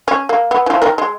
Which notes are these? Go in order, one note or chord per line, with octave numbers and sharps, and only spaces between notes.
C#4
A#3
B3
E3 F3
D#3 A#4
G#3